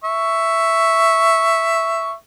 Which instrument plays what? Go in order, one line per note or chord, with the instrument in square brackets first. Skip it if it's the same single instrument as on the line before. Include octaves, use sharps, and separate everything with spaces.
[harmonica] E5 C#6